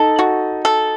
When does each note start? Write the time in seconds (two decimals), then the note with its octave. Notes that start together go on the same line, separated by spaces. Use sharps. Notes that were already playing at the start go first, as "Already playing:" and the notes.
Already playing: D#4 A4
0.19 F#4
0.65 A4